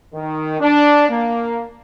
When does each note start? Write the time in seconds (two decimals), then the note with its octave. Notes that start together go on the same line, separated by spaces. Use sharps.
0.14 D#3
0.60 D4
1.10 A#3